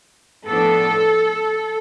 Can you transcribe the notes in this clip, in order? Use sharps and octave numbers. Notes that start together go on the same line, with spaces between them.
A2 F3 B3 D4 A4